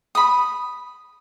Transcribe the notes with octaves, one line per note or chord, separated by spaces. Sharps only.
B5 D#6